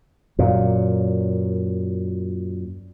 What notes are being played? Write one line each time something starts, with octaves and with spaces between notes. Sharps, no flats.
F#2 A#2